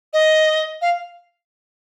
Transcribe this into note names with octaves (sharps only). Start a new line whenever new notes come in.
D#5
F5